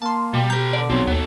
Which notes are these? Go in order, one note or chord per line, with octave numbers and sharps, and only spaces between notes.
A#3 A5 C6
B2 G3
G4 B4 A#5 G6
D3 D5
B1 E2 F#3 C4
D#2 B3 A4